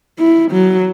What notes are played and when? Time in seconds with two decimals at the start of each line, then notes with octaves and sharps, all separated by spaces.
0.19 E4
0.52 F#3